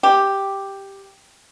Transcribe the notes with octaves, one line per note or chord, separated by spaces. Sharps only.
G4